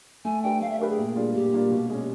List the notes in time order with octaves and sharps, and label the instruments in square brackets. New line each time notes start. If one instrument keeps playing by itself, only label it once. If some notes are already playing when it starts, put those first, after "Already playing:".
[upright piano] A3 [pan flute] G#5
[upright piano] D4 G4 B4 [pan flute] G5
[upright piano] A3 [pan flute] F5
[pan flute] E5
[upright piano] D4 G4 B4 [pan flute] A#4
[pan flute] G#4
[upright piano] A#2
G3 A#3 D4 F4
[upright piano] A#2 [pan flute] G4
[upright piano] G3 A#3 D4 F4
B2
G#3 C#4